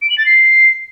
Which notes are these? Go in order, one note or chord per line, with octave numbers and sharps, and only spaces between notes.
D7
F#7
A6
C7